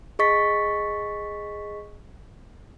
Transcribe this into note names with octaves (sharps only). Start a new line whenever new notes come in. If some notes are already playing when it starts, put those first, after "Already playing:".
G#4 D#5 C#6 A6 B6